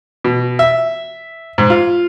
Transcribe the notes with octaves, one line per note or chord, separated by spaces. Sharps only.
B2
E5
G#2
F4